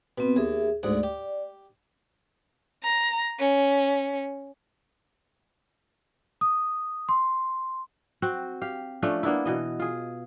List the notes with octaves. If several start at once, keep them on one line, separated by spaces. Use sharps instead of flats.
B2 B3 C4 B4
D#2 G#4 E5
D2 G#2 D5 F#5
G4
A#5
C#4
D#6
C6
C4 F#4 F#5
G4 F5
F3 A3 C#4 D4
A#3 B3 D4 E4
B2 E3 D#5
F4 G#4